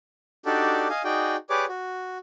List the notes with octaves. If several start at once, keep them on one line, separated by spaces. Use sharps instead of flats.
D4 D#4 F#4 G4 A4 D5
D#5 F5 G#5
D#4 F#4 G#4 D5 G5
G4 G#4 B4 C#5 D5 D6
F#4